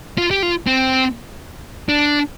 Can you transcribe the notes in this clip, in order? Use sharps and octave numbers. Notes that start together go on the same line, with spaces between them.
F4
G4
F4
C4
D4